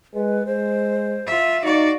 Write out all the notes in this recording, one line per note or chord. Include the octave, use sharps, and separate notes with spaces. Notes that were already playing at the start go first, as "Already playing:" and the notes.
G#3 B4
G#3 C5
F4 E5
D#4 F#4 D5 F5